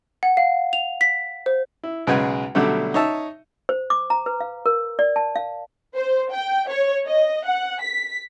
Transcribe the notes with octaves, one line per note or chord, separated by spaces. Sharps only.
F#5
F5
F7
B6
C5
E4
B1 C#3 G#3 B4 F#5 G#5
B2 D3 F#3 G3 A3
D#4 C#5 E5 A5
C5
D6
A#5
B4
F5
A#4
D5
A5
F5
C5
G5
C#5
D#5
F#5
B6